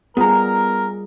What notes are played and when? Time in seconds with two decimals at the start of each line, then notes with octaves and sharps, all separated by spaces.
0.17 G3 B3 F4 G#4 A#4 A#5